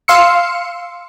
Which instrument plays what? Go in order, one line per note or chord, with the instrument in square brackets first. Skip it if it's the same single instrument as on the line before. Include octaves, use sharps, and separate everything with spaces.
[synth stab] F5 C6 E6 C#7